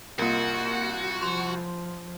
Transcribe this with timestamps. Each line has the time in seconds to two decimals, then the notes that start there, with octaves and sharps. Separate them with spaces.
0.19 C2 A#3 F4 F#4 A#4
1.22 F3 C6